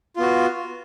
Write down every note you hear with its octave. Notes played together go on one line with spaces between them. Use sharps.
B3 F4 F#4